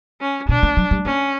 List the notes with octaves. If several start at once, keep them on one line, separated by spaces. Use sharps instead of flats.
C#4
B2 D4
A#3
F#3
G3
A#3 C#4